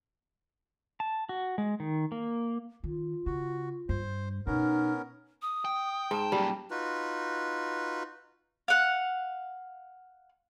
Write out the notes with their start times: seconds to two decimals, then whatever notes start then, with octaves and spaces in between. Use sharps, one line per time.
1.00 A5
1.29 F#4
1.58 G#3
1.80 D#3
2.12 A#3
2.84 D#3 F4
3.26 C#3 F#4
3.89 G2 C5
4.47 B2 B3 C#4 D#4 A#4
5.42 D#6
5.65 G5
6.11 G#2 A5
6.32 F#2 A#2 G3
6.71 D#4 F4 F#4 B4
8.68 F5 F#5